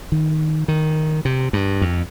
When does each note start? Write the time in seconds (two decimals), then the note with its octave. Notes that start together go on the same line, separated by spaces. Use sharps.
0.12 D#3
0.68 D#3
1.25 C3
1.53 G2
1.81 F2